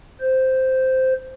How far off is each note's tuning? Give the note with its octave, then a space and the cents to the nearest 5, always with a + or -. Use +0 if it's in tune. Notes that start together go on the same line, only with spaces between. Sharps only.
C5 -5